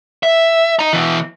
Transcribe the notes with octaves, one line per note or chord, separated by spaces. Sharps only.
E5
D#5 A#5
B2 E3